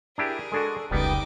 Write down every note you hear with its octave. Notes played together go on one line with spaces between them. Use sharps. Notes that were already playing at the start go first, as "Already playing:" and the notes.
D4 E4 G4 G#4 A#4
G#3 D4 F#4 A4
F1 C#2 C#3 G3 B3 D#4 G5 D6